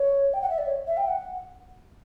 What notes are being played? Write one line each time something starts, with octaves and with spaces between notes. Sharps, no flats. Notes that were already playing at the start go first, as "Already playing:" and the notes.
Already playing: C#5
G5
F#5
E5
D5
C#5
E5
G5
F#5